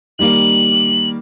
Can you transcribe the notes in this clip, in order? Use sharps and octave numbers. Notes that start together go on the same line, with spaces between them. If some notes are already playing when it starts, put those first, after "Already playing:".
D#3 G3 A#3 F#7